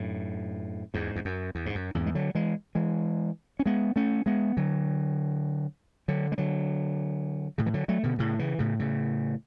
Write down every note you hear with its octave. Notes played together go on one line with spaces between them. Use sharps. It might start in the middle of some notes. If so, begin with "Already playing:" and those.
Already playing: F#2 A2
E2 G#2
E2
F#2
E2
G#2
F#2
E2 G#2
G#3
D3 F#3
E3 G#3
E3 G#3
C#4
G#3 B3
A3 C#4
G#3 B3
D3 F#3
D3 F#3
G#3
D3 F#3
A2 C#3
E3
D3 F#3
F#3 A3
B2 D3
A2 C#3
C#3 E3
A2 C#3
A2 C#3